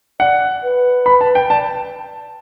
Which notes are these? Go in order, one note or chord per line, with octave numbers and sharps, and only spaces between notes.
D5 F#5
B4
B5
A5
G5
D5 A5